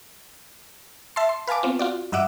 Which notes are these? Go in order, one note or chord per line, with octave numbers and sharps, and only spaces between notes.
E5 A5 C6
C6
B4 F5 G#5 A5 D6
B3 C4 F4
F4 F#4 D5
G2 D#5 E5 F#5 D6 E6